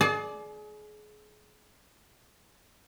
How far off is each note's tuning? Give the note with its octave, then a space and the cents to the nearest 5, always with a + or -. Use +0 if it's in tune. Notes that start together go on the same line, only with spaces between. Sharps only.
G#4 +30 D5 +0 A5 -45